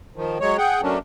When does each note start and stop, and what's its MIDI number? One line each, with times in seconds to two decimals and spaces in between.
0.16 0.38 51
0.16 0.38 53
0.40 0.57 54
0.40 0.57 56
0.40 0.57 73
0.58 0.81 68
0.58 0.81 78
0.58 0.81 79
0.82 0.99 54
0.82 0.99 57
0.82 0.99 58
0.82 0.99 61
0.82 0.99 62